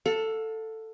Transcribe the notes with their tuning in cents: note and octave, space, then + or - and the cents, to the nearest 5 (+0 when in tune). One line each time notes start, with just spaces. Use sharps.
A4 +10 F5 +40